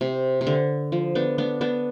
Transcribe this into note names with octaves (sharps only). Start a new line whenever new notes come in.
C3
C3
D3
F3
B3 D4
B3 D4
B3 D4